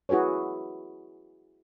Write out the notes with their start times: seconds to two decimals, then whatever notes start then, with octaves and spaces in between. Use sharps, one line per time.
0.09 E4 F#4 G#4 B4 C#5